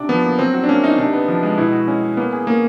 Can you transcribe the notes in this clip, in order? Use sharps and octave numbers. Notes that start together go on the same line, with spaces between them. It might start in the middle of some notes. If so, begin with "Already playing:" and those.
Already playing: C3 D4
F3 B3
A#3
F#3 C4
F#4
D4
A#3 C#4
D#4
C3 D4
B3
F3
G#3
B2 E4
F#4
G#3 C#4
C#4
A#3 B3
G#4
A#3 C#4